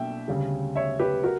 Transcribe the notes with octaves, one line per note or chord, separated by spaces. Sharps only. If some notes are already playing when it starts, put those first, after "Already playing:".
Already playing: B2 A#3 D4 E5 G5
D2 C#3 G3
C#5 E5
G4 B4
F#4 A#4